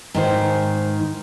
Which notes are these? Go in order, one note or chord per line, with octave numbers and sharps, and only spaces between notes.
G#2 D#3 C5